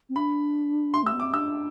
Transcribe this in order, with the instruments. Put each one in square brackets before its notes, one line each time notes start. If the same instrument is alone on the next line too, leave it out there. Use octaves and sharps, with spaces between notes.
[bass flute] C4
[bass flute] D4 [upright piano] B5
[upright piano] C6
[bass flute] A3 [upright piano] E6
[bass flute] B3
[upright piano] D6
[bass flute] C4
[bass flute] D4 [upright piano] E6